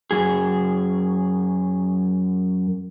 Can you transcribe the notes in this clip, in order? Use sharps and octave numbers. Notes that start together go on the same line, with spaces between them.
F#2 G#4